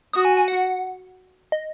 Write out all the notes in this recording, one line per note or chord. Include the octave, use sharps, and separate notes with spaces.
F#4 D#6
G#5
G#5
F#5
D#5